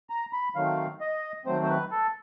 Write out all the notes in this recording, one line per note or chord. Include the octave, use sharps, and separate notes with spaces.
A#5
B5
D#3 F#3 A3 C4 F5
D#5
D#3 F#3 A3 C4 C5
C5
B4
A4